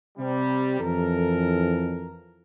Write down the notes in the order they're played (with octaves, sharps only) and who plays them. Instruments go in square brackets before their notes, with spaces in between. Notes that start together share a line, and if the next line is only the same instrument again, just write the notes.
[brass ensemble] C3 G3
[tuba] F2 [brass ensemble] E3 A4 A#4